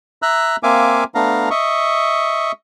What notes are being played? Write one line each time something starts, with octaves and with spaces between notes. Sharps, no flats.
E5 A#5 E6 F#6
A#3 C4 E5 F5 G#5 D6
A3 B3 D4 F5 A#5
D#5 E5 C#6